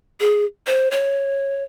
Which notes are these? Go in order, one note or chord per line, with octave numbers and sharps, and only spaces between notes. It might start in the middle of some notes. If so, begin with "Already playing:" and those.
G#4
C5
C#5